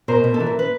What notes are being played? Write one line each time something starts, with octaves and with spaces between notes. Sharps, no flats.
B2 A#4 C5
B2
A4
E3
A#4
B4